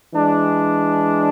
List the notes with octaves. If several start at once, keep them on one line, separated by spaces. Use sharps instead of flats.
E3 G#3 D4